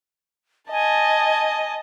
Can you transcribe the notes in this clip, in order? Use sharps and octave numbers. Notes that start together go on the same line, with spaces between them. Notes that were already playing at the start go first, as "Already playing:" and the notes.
D#5 G#5 A5